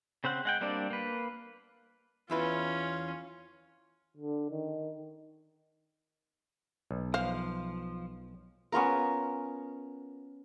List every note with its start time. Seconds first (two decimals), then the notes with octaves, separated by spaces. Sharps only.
0.24 C#3 C4 C5 F#5
0.45 G#3 F#5 G5
0.61 G3 A#3 C4 D4 D5
0.90 A#3 B4
2.30 E2 C#4 E4 F4 B4
4.17 D3
4.51 D#3
6.91 B1
7.14 F3 C5 F5
8.72 B3 C#4 F4 A#4